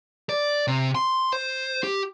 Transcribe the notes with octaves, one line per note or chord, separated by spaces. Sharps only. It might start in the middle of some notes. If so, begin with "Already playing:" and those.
D5
C3
C6
C5
G4